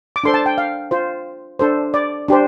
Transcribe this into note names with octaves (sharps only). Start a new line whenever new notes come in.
D6
D4 A4 C5 C6
A5
G5
F5
F4 C5
D4 A4 C5
D5
D4 G4 C5